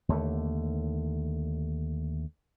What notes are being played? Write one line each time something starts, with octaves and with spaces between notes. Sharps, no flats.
D#2 D3 A3